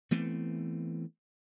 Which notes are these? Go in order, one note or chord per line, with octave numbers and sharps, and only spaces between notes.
E3 A3 B3 C4